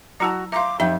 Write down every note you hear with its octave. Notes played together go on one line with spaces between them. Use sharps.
F#3 E4 F#4 A5 A#5 E6
E5 F5 A#5 C6 D6
F2 D#4 G4 E5